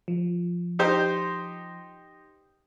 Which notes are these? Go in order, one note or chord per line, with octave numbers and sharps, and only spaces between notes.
F3
D#4 G4 C5